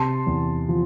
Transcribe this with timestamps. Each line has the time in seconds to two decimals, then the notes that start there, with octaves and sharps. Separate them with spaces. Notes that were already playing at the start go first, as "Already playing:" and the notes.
Already playing: C3 A5 C6
0.27 E2
0.69 F3